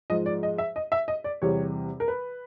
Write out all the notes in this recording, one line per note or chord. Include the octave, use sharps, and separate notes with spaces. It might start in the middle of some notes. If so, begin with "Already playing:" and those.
G#2 F3 G#3 D#5
D5
D#5
E5
D#5
E5
D#5
D5
E2 C3 E3 G3 C#5
A#4
B4